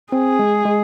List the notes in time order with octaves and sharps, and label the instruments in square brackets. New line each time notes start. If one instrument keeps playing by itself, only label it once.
[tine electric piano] C4 [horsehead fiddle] G#4
[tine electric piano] G#3
G#3